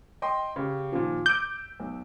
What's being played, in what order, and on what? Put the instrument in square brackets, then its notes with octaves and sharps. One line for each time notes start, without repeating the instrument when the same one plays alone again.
[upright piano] D#5 G5 C6
C#3 G4
A#2 D#3 F3
[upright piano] D6 E6 D7 [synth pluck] G6
[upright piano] B1